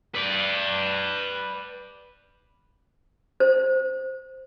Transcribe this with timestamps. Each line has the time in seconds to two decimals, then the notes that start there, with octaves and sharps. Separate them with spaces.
0.15 B4 D5
3.40 C5